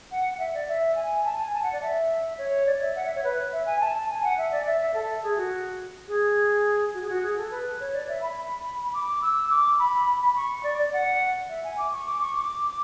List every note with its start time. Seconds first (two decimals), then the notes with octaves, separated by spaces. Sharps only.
0.11 F#5
0.33 F#5
0.39 E5
0.54 D5
0.68 E5
0.95 G#5
1.24 A5
1.38 G#5
1.53 A5
1.63 F#5
1.72 D5
1.82 E5
2.38 C#5
2.66 D5
2.82 E5
2.95 F#5
3.05 E5
3.15 C#5
3.24 B4
3.52 E5
3.66 G#5
3.80 A5
4.09 G#5
4.24 F#5
4.37 E5
4.51 D5
4.66 E5
4.81 E5
4.94 A4
5.23 G#4
5.37 F#4
6.08 G#4
6.94 F#4
7.01 G#4
7.09 F#4
7.23 G#4
7.37 A4
7.51 B4
7.80 C#5
7.93 D5
8.08 E5
8.21 B5
8.93 D6
9.22 E6
9.49 D6
9.79 B5
10.20 B5
10.35 C#6
10.63 D5
10.78 D5
10.93 F#5
11.49 E5
11.64 G#5
11.77 D6
11.91 C#6
12.05 D6
12.21 C#6
12.34 D6
12.63 D6